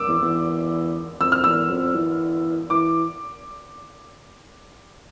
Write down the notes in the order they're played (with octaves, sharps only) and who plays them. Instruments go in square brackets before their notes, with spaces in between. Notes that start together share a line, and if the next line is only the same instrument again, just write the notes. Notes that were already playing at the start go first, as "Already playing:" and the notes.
Already playing: [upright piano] D6 E6
[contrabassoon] E2
E2
[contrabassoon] F2 [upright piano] E6
[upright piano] F6
[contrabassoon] E2 [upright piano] E6
[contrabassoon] F2
E3
[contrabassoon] E3 [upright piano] D6